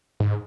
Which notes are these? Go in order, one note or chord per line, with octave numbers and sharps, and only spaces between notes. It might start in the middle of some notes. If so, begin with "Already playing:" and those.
G#2